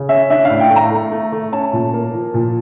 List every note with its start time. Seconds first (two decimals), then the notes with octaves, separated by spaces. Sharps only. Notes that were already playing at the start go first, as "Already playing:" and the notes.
Already playing: C#3
0.09 C#4 E5
0.30 D4 E5
0.45 F5
0.50 A2
0.60 G5
0.70 A3
0.76 A#5
0.91 A3
1.11 A3
1.32 A3
1.52 C#4 A5
1.73 A#2
1.94 A#3
2.14 F3
2.34 A#2